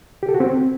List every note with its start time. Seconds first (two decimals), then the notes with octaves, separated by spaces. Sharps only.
0.23 G4
0.29 A4
0.34 F#4
0.40 C4